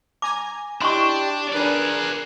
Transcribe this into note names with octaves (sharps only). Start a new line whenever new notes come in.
G#5 A#5 D6
D4 E4 G4 D#5 G5 C6 C#6
D4 G#4 A#4 B4 D5 F#6